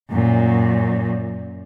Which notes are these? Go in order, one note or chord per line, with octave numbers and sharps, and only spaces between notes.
F#2 A#2